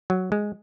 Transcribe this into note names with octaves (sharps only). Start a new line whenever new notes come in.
F#3
G#3